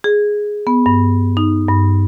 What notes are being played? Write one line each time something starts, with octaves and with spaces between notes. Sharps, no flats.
G#4
B3
G2
D#4
G2